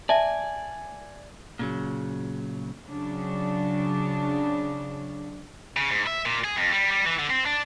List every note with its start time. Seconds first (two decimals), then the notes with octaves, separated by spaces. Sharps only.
0.09 D5 E5 G#5 A5
1.59 A#2 C#3 F#3
2.86 C#3 F#3 D4
5.77 C#3
5.91 G#2
6.07 E5
6.25 A#2
6.44 G#4
6.57 F2
6.72 G3
6.91 G3
7.06 E3
7.19 D3
7.30 C4
7.46 D4